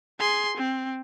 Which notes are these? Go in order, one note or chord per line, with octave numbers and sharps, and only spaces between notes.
G#4 C6
C4